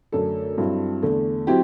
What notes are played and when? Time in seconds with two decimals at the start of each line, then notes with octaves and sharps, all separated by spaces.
0.12 F#2 D3 A3 D4 A4
0.58 G2 F#3 C4 E4
1.02 E2 D3 A3
1.47 F#3 C4 E4 G4